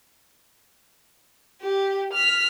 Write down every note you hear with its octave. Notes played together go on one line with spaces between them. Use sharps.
G4
F6 B6